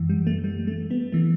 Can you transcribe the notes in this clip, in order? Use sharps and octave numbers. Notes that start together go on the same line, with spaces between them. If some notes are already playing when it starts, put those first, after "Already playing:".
Already playing: F#2 E3
G3
A3
G3
A3
B3
E3 A3